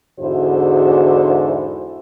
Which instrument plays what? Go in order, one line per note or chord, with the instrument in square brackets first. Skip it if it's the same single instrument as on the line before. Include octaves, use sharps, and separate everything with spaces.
[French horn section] E2 G#2 D3 E4 F#4 C5